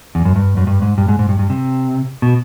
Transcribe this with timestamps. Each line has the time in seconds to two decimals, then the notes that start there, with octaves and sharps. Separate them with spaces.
0.15 E2
0.25 F#2
0.36 G2
0.57 F#2
0.67 G2
0.82 G#2
0.98 G2
1.08 G#2
1.19 G#2
1.29 G2
1.39 G2
1.50 C3
2.22 B2